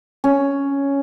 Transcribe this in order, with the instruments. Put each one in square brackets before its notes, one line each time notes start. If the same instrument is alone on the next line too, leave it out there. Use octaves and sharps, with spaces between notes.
[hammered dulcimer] C#4